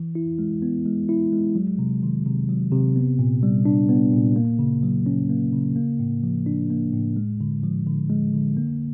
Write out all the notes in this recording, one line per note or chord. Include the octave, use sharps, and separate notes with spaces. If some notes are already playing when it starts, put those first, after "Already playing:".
Already playing: E3
E4
G#3
B3
G#3
E4
G#3
F#3
C3
D#3
C3
F#3
C3
B3
A#2
G3
D4
B3
A#2
A#3
C#3
F#3
C#4
A#3
C#3
A#3
A2
F3
D4
A#3
A2
G#3
D3
F3
D3
G#3
D3
A#3